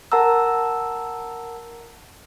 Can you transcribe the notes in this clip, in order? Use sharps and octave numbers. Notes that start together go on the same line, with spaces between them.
A#4 F#5 A5 A#5 E6